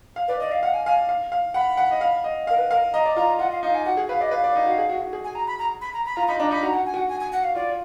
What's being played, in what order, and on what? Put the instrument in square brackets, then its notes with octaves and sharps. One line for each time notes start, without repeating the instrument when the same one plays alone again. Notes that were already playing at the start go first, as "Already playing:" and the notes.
[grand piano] F5
[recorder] B4 [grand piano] D5
[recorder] D5 [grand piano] D#5
[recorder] F5
[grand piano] F5 [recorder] F#5
[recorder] G#5
[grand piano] F5 [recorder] G#5
[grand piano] F5
F5
[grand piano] F#5 [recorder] B5
[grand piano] F#5
D#5
F5
D#5
[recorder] A#4 [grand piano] F5
[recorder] B4
[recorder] A#4 [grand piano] F5
[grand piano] D#5 [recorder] A#5
[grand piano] D5
[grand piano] F4 [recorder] A#5
[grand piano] F4 [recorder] F#5
[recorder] F5
[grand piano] D#4 [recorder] F5
[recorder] G#5
[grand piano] F#4 [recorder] F#5
[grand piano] G#4
[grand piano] B4 [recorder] F5
[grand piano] D5 [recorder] D#5
[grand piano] B4 [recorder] F5
[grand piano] D5
D#4
F#4
G#4
F#4
F#4
G#4
[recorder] G#5
A#5
B5
A#5
B5
A#5
B5
[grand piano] F4 [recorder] A#5
[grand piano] D#4 [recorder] B5
[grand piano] D4 [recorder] A#5
[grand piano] D#4 [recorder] B5
[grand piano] F#4 [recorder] A#5
[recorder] F#5
G#5
[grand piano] F#4 [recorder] F#5
[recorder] G#5
G#5
F#5
F5
[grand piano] F4 [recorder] D5